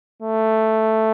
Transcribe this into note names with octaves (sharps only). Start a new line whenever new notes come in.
A3